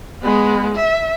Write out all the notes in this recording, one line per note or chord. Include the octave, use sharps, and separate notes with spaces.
G#3 B3
E5